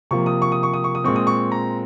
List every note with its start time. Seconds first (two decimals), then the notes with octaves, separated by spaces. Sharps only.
0.11 C3 F3 A#3 C#6
0.26 D#6
0.42 C#6
0.52 D#6
0.63 C#6
0.73 D#6
0.84 C#6
0.95 D#6
1.04 A#2 G#3 C4 C#6
1.16 D#6
1.27 C#6
1.52 A#5